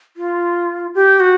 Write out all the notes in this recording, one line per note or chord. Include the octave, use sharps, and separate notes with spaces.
F4
G4
F#4